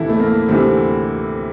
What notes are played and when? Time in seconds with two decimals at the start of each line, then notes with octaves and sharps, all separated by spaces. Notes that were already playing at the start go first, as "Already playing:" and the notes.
Already playing: D2 C3 E3 E4 A4
0.10 A3
0.20 A#3
0.49 D2 C3 E3 C4